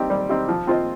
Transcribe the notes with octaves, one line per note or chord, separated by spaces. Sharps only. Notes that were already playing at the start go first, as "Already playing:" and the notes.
Already playing: G3 C4 D#4 G4
G3
C4 D#4 G4
F3
C4 F4 C5 D#5